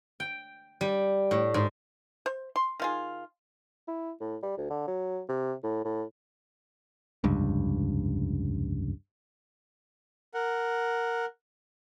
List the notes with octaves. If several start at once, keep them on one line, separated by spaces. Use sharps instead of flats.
G5
G3
A2
G#2
C5
C6
D#3 F4 G#4
E4
A2
G3
D2
D3
F#3
C3
A2
A2
F1 C#2 G2
A#4 F#5